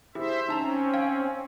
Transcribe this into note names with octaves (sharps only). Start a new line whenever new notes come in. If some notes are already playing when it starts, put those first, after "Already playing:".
E4 G4 G#4 C5 E5
C4 C#4 D#4 A5 A#5
F5 G5 G#6